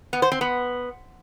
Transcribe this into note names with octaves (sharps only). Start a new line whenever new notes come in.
B3
C5
C4
B3